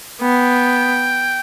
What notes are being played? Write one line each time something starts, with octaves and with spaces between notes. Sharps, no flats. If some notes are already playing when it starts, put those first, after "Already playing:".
B3 G5